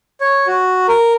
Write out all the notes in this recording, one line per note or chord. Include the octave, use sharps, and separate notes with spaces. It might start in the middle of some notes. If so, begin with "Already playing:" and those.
C#5
F#4
A#4